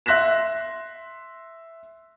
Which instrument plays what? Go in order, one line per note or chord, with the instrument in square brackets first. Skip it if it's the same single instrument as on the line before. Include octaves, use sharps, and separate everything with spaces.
[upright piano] E5 C6 F#6 A#6 B6 E7